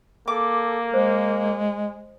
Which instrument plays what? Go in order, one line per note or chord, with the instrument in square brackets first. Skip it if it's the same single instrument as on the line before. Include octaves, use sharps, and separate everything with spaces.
[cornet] A#3 [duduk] A4 [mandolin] D6
[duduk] G#3 [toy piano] C5